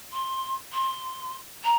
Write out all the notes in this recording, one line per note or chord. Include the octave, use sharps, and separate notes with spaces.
C6
C6
A#5